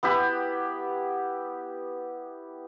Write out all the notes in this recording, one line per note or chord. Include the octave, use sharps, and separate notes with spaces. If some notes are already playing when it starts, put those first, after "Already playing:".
B3 E4 G4 B5